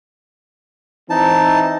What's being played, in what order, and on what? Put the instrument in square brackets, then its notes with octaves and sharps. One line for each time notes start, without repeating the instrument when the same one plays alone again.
[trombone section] E3 C4 [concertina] D#4 A5